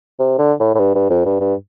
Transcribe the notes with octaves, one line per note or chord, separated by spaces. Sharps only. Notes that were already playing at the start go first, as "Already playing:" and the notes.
C3
D3
A2
A2
G2
G2
F2
G2
G2